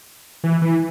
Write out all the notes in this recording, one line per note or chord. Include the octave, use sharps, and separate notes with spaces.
E3
E3